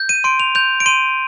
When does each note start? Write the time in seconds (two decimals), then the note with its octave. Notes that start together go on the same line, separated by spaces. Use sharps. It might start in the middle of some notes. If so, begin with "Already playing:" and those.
Already playing: G6
0.09 D#7
0.24 C6 D7
0.40 F7
0.55 G6 F7
0.80 D7
0.86 C6 D#7